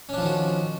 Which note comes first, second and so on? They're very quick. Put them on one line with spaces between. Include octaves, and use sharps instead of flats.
C#4 D4 F3 D#3 F#4